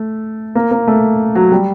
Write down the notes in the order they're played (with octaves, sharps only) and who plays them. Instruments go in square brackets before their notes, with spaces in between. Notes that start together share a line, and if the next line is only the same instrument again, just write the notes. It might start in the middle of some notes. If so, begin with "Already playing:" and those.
Already playing: [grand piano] A3
A#3
A#3
A3
F#3
G3